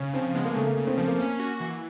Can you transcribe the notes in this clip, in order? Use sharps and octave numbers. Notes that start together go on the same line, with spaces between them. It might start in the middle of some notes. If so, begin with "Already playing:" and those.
Already playing: C#3 C#4
F3 C4
G#3 B3
A#3
C#3 A3
A#3
C#3
C4
F3 C4
A#3
C#4
F#4
E3